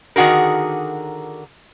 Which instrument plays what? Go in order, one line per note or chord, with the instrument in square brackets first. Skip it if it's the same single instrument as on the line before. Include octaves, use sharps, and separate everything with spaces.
[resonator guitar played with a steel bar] D3 D#3 F#4 G#4 A#4